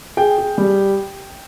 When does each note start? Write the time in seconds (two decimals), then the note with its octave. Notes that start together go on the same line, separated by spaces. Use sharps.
0.17 G#4 G5
0.38 G#4
0.58 G3